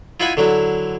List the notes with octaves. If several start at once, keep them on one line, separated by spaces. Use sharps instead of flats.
E4 F4 D#5 F#5 G#5 B5
D3 F#3 E4